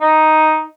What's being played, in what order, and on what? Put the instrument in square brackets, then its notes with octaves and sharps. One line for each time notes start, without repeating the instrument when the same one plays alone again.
[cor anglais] D#4